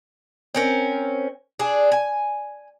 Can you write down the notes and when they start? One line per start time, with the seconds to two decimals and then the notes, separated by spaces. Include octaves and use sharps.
0.55 C4 C#4 A#4
1.59 D4 G#4
1.92 G#5